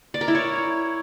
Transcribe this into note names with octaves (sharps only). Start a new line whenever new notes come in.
D5
A#4
E4
C#5